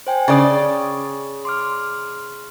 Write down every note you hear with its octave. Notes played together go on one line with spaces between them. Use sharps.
C5 G5 G#5
C#3 D5 D#6 A6
C6 D6 F6